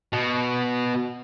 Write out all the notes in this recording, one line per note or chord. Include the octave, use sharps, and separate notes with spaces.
B2